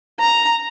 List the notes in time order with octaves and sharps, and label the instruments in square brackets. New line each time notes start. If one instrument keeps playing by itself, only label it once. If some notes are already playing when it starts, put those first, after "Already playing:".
[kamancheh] A#5